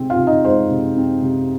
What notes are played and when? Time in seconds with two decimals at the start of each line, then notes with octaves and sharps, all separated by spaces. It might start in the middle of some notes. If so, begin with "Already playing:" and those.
Already playing: C3 G#3 C4
0.10 F4 F5
0.18 C3
0.27 D#4 D#5
0.45 G#3 C5
0.71 C3
0.97 C4
1.22 C3